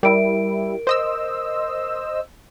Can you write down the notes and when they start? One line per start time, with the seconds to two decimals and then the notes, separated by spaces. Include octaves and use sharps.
0.03 G3 E4 A#4 D7
0.87 C5 D#5 E6